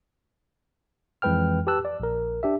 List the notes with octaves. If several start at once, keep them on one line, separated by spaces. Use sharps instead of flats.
F2 E3 G#3 B4 G5 F6
G4 B4 A5 E6 F#6
D5
A#1 A#4
D4 G4 E5